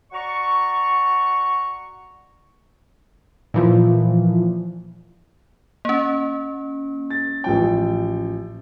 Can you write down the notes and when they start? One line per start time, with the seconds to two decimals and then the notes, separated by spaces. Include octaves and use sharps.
0.12 F#4 D5 A#5 C#6
3.54 A#2 E3 F3
5.85 A#3 C#4
7.10 A6
7.44 A1 F3 G5